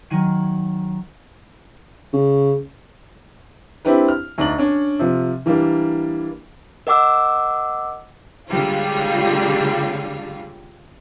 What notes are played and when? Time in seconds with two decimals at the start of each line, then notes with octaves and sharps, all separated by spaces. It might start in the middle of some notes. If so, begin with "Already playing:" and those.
0.10 D#3 F#3 F#5 G#5 D#7
2.13 C#3
3.85 C4 D4 E4 G4 B4
4.09 F6
4.38 D2 D#4 D5 F#7
4.58 C#4 D4
4.99 C3 F3
5.46 E3 G3 A#3 D4
6.87 A#4 D#5 F#5 D6 E6
8.50 A#2 D3 G3 G#3 C#4 F4